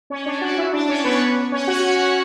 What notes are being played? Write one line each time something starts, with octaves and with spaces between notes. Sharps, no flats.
C#4 C#5
D4 D5
F#4 F#5
E4 E5
D4 D5
C#4 C#5
B3 B4
C#4 C#5
F#4 F#5